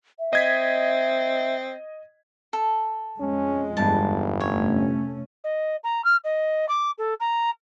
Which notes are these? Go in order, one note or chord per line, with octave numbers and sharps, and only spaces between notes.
E5
C4 D#5 G#6 B6
A4
F2 G#3 C#4
G1 E2 G2 D#4 A5
F1 A3 C#4 C#5
D#5
A#5
F6
D#5
D6
A4
A#5